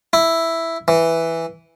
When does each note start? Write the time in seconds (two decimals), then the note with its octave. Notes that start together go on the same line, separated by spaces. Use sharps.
0.13 E4
0.88 E3